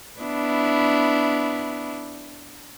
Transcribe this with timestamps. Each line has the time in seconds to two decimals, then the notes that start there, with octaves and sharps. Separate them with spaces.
0.20 B3 D4 E4